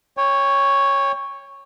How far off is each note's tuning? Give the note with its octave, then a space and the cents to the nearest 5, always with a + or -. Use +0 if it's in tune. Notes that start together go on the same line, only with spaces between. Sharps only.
C#5 +0 G5 +40